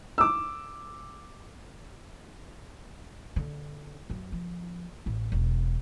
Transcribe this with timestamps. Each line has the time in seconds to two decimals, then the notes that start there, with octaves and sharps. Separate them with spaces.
0.18 D6 E6
3.36 D3
4.10 F#2
4.32 F3
5.06 A1
5.32 E1